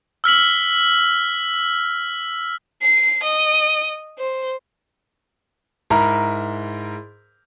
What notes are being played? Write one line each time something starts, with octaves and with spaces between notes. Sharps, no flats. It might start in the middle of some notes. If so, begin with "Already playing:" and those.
E6 F6 B6 F#7
C7
D#5
C5
G#2 E4 A#4 A#5 B5